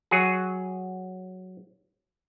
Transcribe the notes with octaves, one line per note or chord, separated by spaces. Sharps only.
F#3 F#4 G#4